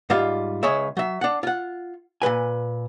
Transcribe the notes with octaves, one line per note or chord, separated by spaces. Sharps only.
G#2 G3 F4 F5
C#2 G#4 C#5 E5
F#3 E5
D4 F#5
F4 F#5
A#2 F#3 B4 G#5